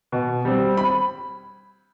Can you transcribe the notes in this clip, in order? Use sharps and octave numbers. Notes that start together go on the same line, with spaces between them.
B2
G3 C4
B5